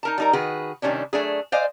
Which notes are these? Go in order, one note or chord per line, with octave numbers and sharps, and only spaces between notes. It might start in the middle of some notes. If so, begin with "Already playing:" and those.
D#4 A#4 A5
G3 D#4 A#4
D#3 F#4 G#4 B4
C3 D#3 G3 C#4 D4
F#3 A3 D4 G#4
C5 D5 D#5 F5 G#5